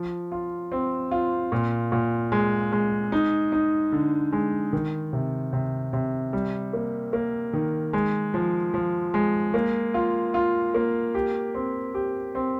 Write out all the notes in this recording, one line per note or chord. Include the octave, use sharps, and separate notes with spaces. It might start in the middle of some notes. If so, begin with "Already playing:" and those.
Already playing: F3
F4
C4
F4
A#2
A#2
G#3
G#3
D#4
D#4
D3
G#3
D#3
C3
C3
C3
G3
A#3
A#3
D#3
G#3
F3
F3
G#3
A#3
F4
F4
A#3
G4
C4
G4
C4